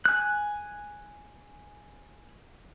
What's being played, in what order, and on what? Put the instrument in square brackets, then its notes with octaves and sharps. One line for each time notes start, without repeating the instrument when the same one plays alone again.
[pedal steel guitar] G#5 F#6